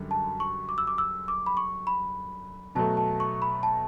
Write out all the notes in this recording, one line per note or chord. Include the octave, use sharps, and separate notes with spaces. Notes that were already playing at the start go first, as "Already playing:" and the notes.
Already playing: F#2 D3 G3
A5
C#6
D6
E6
D6
E6
D6
B5
C#6
B5
B2 F#3 A3 A5
A5
C#6
B5
A5